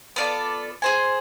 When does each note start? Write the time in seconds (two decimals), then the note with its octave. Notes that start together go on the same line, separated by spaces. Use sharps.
0.16 B3 F4 A4 D5
0.82 G#4 C5 G#5